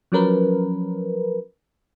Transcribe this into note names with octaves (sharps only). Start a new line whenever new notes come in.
F3 F#3 C#4 A#4 B4